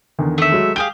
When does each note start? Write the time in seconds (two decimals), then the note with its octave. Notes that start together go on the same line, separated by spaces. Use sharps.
0.19 E2 D3 D#3
0.38 A3 E5
0.52 F#3 G#3
0.76 G4 G#4 F5 G7